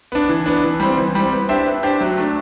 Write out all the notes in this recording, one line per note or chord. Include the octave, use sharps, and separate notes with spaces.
B3 D4
E3
B3 D4
E3
G3 C4
E3
G3 C4
B3
D4 G4 C5 E5
B3
D4 G4 C5 E5
F#3
A3 D4